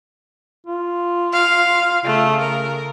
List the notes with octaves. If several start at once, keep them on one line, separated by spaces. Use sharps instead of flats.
F4
F5
C#3 A3
A#4